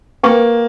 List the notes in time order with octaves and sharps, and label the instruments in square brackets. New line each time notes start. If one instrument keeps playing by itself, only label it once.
[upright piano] A#3 [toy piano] B4 G5 C#6